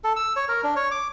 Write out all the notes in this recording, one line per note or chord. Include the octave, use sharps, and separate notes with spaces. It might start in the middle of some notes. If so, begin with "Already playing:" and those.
A4
E6
C#5
A#4
D4
C#5
D6